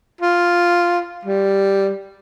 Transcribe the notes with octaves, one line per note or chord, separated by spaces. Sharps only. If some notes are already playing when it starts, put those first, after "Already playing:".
F4
G3